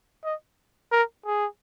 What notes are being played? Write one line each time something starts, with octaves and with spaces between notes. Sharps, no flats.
D#5
A#4
G#4